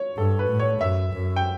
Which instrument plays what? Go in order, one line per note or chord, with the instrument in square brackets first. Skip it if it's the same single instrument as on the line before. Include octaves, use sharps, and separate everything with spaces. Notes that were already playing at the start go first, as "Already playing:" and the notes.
Already playing: [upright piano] C#5
[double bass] G2 [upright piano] A4
[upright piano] B4
[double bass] A2
[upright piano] C#5
[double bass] F#2 [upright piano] E5
[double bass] F#2
[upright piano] G5